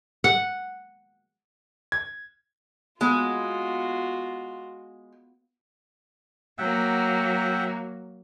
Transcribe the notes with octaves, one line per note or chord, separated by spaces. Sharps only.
F#5
G#6
G#3 B3 F4 F#4
F#3 A#3 E5 F#5 G5